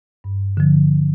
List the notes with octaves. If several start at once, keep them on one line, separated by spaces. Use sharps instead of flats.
G2
D3 F3